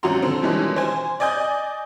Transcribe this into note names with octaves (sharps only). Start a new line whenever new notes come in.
G#1 F#3 C#4 F#4 A#5 C6
D3 C4
B2 D#3 E3 G3 G#3 C#4
C5 G#5
D5 D#5 G#5 D#6 G6